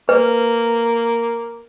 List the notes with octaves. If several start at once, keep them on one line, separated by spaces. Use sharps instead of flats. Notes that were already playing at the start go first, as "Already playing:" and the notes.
A#3 B4